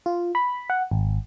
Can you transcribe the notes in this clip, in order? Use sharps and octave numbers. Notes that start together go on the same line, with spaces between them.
F4
B5
F#5
G#1